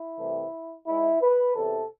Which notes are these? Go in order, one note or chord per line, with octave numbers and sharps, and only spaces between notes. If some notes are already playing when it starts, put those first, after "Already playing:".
Already playing: E4
C2 C3 E3 A3
G#2 G#3 E4
B4
E2 C3 E3 A4